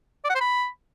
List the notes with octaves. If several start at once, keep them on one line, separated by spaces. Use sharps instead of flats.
D5
F#5
C5
B5